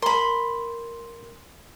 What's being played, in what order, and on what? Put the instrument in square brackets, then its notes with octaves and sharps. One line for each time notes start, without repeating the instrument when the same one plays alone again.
[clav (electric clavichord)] A#4 [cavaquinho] B5 C6